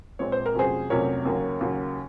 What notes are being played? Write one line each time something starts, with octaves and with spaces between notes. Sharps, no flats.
A#1 A#2 G#3 C4 C#5
C5
A#4
F1 F2 C3 F#3 C#4 G#4 C5
F1 F2 C3 F#3 C#4 A#4 C#5
D#2 C#3 F#3 A#3
D#2 C#3 F#3 A#3